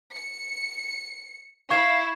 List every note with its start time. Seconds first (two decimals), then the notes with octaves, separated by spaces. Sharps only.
0.14 C#7
1.70 E4 F5 C#6 G#6 E7